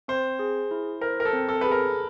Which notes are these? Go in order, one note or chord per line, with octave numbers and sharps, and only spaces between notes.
C4 C5
G#4
E4
A#4 C5
A#4
A4
C4
A4
G#4 B4
A#4